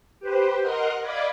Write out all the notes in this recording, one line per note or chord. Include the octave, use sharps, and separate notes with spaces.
G4 B4 C5
A#4 D#5 F#5 C6 F6 F#6
D5 D#5 F5 B5 D6 G#6